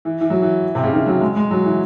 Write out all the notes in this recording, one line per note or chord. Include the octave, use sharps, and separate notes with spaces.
E3
E3
F#3
E3
C3
C#3
D#3
F#3
G#3
G#3
F#3
E3